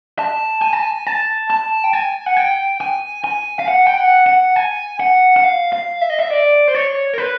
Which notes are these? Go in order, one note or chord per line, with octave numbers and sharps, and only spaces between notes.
A5
G#5
A5
G#5
A5
A5
G5
G#5
F#5
G5
G#5
G#5
F5
F#5
G5
F#5
F#5
G#5
F#5
F#5
F5
F5
E5
D#5
E5
D5
C5
C#5
A#4
B4